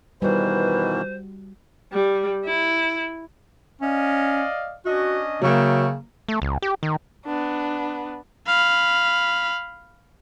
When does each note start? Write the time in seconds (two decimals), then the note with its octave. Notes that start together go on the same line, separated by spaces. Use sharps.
0.22 B2 D#3 E3 G3 F#4 B4 C5
1.93 G3
2.45 E4
3.81 C#4 D5 D#5 F5
4.85 C#4 D4 F#4 D#5
5.42 C#3 F#3 A#3 E5 G5 C#6
6.29 A3
6.42 C#2
6.62 G4
6.83 D#3
7.26 B3 D4
8.47 F5 B5